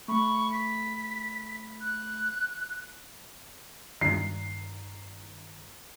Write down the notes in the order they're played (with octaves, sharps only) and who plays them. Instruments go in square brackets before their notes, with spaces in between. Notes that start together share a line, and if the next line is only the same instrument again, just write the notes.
[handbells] A3 B5 [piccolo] C#6
[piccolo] B6
F#6
[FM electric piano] G2 D#3 [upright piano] C7